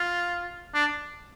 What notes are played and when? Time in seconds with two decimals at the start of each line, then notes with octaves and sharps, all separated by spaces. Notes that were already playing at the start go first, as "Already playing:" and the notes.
Already playing: F4
0.74 D4